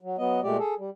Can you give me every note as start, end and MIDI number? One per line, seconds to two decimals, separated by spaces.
0.01 0.16 54
0.18 0.40 54
0.18 0.40 59
0.18 0.40 75
0.43 0.57 46
0.43 0.57 56
0.43 0.57 57
0.43 0.57 67
0.43 0.57 74
0.58 0.75 68
0.58 0.75 69
0.79 0.90 55